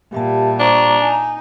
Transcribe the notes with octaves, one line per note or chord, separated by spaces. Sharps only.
A#2 G3 G4 E5 A5
D4 C5 A#5 C#6 D6
D#4 G#5